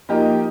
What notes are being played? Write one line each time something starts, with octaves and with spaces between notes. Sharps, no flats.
F3 A#3 D#4 G4